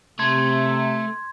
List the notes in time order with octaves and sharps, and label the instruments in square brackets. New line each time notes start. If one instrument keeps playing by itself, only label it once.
[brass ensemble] C3 [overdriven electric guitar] A3 [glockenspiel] C6 G#6